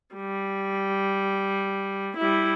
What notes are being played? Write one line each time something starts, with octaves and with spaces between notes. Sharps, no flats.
G3
G3 E4